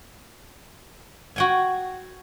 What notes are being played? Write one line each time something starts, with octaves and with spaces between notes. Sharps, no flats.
F#4 G5 G#5